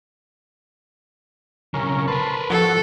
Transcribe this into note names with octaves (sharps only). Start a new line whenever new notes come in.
B1 C#3 C#4 A#4
A#4 B4 A5 B5 C6
F3 F#4 A4